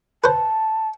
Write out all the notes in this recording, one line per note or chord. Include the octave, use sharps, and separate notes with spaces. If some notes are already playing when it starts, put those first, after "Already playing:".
B4 C5 A5